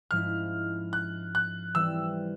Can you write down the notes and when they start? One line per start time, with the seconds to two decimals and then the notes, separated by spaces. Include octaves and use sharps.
0.11 G#2 F3 G#3 C#4 E4 F6
0.93 F#6
1.35 F#6
1.75 E3 G3 C4 E6